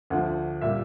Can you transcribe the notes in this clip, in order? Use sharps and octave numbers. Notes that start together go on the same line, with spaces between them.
D2 D3 F3 F#5
A#2 G3 E5